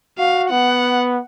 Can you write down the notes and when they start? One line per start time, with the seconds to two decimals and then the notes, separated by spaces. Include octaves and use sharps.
0.18 F#4 F5
0.50 B3 F#5